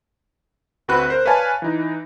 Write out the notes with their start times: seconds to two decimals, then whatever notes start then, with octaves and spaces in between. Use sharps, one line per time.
0.88 D2 C4 F#4 B4 B5 F#6
1.10 A#4 C5
1.26 B4 C#5 D5 F5 G#5 A5
1.62 E3 D#4